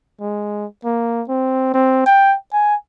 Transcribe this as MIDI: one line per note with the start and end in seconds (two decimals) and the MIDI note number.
0.20 0.66 56
0.85 1.23 58
1.28 1.72 60
1.74 2.02 60
2.06 2.36 79
2.53 2.75 80